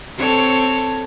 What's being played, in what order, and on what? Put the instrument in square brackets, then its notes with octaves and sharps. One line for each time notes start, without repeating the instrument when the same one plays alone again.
[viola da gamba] C4 A4 C#5